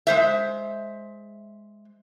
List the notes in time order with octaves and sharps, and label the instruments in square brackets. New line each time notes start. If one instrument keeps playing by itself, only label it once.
[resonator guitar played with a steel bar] G#3 C5 E5